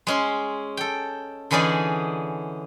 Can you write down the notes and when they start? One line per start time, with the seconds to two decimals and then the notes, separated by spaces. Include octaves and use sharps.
0.07 G#3 C#4 C6
0.77 A4 G5
1.51 D3 E3 C#4 D#4 G#4 D5